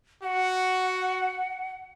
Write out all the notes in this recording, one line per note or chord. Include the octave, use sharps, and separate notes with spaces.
F#4 F#5